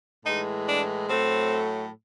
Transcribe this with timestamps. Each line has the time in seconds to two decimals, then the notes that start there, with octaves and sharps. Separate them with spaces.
0.25 A2 E3 G#3 D#4
0.66 D4
1.07 A2 F#3 A3 C4